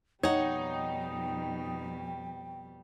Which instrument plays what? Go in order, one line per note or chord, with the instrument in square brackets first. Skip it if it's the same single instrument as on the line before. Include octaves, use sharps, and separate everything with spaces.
[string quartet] F2 B2 G3 [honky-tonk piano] D#4 [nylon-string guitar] C#5 F#5 [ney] G5